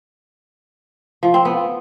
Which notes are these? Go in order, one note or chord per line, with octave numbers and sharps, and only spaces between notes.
F3
C4
B3